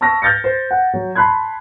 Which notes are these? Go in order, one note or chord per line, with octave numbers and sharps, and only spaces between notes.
A5 C#6 E6 F6 A#6
F6 G6 A6 A#6 C#7
C5
F#5
F#3
A5 B5 C6 F#6 G#6